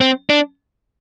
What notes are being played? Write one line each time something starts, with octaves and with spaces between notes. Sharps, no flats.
C4
D4